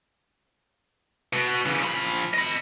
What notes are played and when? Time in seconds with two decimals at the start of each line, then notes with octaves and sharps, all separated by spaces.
1.33 B2 B3
1.66 C#3 E3
1.81 F3 B5
2.34 D#5 B5